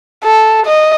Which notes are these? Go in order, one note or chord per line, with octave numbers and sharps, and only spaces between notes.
A4
D#5